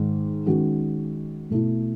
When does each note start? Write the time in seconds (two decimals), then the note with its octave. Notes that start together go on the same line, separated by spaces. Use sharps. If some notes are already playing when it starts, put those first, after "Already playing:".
Already playing: G#2 D#3 G#3 D#4
0.46 D#3 G#3 C#4 F#4
1.50 B2 A3 E4